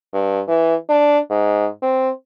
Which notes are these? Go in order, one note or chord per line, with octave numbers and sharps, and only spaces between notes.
G2
E3
D4
G#2
C4